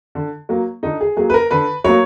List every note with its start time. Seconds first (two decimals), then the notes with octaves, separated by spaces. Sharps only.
0.15 D3
0.49 F#3 A#3
0.83 D3 D#4
1.01 G#4
1.17 F#3 A#3 G#4
1.30 B4
1.34 A#4
1.51 D3 B4
1.84 F#3 A#3 C#5